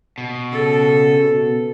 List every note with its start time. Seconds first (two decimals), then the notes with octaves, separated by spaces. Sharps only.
0.18 B2
0.52 C#3 A4
1.19 B2